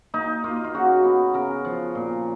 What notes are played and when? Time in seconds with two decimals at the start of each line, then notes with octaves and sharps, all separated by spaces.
0.14 A#3 D#4
0.44 A#3 F4
0.64 F4
0.74 C#3 F#4
1.04 B3
1.34 C#3 A#4
1.65 F3
1.95 A#2